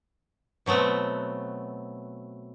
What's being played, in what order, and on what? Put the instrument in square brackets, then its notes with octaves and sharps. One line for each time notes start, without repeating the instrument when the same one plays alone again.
[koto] B2 F#3 A3 B3 C4